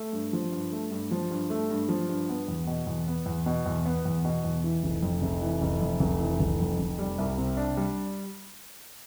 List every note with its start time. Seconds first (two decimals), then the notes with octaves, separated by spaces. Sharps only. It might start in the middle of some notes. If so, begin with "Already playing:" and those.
Already playing: A3
0.13 G2
0.33 F3
0.52 G2
0.72 A3
0.91 G2
1.11 F3
1.30 G2
1.50 A3
1.70 G2
1.89 F3
2.09 G2
2.29 B3
2.48 E2
2.67 B2
2.87 E2
3.07 B3
3.26 E2
3.46 B2
3.66 E2
3.86 B3
4.05 E2
4.25 B2
4.44 E2
4.64 E3
4.83 F1
5.03 F2
5.22 F1
5.42 E3
5.61 F1
5.81 F2
6.00 F1
6.20 E3
6.40 F1
6.60 F2
6.79 F1
6.99 G3
7.18 C2
7.38 C3
7.57 D4
7.77 G3